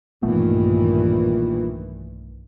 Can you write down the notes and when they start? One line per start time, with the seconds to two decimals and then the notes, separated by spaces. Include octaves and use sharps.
0.23 B1 G2 A#2 D#3 E3 A3 B3